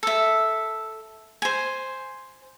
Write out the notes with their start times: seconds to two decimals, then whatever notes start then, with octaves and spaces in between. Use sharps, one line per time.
0.03 A4 E5
1.42 C5 G#5